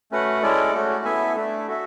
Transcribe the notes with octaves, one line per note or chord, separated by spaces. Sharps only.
A3 C#4 F#4 B4 F#5
G#3 C#4 E4 A4 D5
A3 C#4 F#4 A4
B3 E4 A4 E5 G#5
A3 D4 A4 E5
F#4 A4 E5